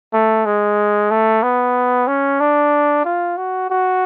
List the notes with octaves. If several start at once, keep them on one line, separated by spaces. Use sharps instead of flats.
A3
G#3
A3
B3
C#4
D4
F4
F#4
F#4